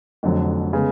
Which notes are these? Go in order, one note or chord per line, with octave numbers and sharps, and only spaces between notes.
F1 F2 D3 F#3
C#3 G#3 B3